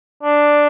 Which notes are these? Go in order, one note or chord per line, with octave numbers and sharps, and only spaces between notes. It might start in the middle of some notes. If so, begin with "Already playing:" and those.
D4